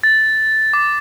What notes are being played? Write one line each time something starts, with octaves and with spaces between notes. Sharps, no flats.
A6
D6